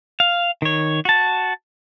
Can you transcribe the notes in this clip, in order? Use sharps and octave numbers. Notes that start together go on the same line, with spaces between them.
F5
D#3 C#5
F#4 A5